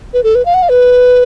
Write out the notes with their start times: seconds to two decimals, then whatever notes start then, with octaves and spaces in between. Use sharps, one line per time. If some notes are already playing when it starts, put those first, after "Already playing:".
0.13 B4
0.23 A4
0.35 B4
0.45 F5
0.54 F#5
0.62 F5
0.70 B4